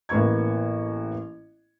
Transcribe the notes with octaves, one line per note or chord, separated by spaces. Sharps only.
A1 A#3 B3 C#6 G#6